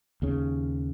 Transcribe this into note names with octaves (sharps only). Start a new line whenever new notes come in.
D#2 C#3